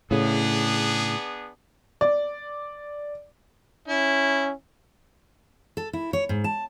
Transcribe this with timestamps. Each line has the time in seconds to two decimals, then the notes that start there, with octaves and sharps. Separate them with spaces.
0.11 A2 C#3 B3 D4 G#4
2.01 D5
3.88 C#4 E4
5.77 A4
5.93 E4
6.13 C#5
6.29 G#2
6.44 A5